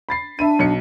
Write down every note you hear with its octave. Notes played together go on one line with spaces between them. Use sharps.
B5 A6 C7
D4 E5 B5 D#7
B1 C#7